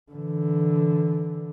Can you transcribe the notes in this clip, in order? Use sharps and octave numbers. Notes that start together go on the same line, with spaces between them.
D3 E3